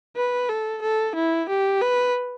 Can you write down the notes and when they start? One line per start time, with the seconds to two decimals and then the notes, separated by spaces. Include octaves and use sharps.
0.16 B4
0.49 A4
0.82 A4
1.15 E4
1.49 G4
1.81 B4